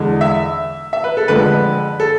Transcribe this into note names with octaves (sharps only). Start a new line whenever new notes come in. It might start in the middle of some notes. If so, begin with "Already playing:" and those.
Already playing: E2 D3 G#3
E5
E5
B4
A4
F2 D3 G#3 B4
A4